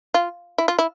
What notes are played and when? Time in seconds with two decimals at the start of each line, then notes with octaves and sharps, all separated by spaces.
0.14 F4
0.58 E4
0.68 F4
0.79 E4